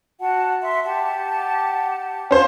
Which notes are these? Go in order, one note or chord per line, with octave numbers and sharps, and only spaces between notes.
F#4 F#5 A5
E5 C6
G4 F#5 A5
C#4 C5 F5